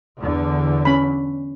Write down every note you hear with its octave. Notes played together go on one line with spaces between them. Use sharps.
E2 D3
C#4 B5